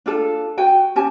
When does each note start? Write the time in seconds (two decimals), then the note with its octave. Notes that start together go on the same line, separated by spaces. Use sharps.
0.06 D4 F4 A4
0.58 F#4 G5 G#5
0.96 C#4 G4 G#5 A5